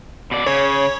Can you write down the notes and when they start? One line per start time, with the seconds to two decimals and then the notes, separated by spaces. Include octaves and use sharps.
0.31 B2 D5
0.46 C#3 C#5